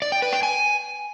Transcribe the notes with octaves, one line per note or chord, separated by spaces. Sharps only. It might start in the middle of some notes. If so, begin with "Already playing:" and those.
D5
G5
B4
G5
G#5